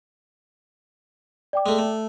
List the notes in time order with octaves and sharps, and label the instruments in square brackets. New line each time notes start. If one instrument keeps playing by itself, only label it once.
[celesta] D5 G5 D6
[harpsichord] G#3 A3
A3